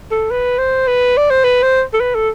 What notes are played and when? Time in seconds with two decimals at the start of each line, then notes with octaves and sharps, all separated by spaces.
0.11 A4
0.31 B4
0.58 C5
0.88 B4
1.17 D5
1.30 C5
1.44 B4
1.63 C5
1.93 A4
2.01 B4
2.15 A4